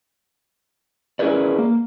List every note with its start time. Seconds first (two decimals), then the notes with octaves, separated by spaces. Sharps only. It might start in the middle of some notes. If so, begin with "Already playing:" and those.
1.19 C#4 E4 G#4 A#4 B4 D5
1.59 A#3